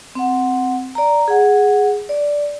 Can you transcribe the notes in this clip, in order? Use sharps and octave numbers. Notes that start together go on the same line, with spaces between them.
C4 F#5
D5 A#5
G#4 F#5
D5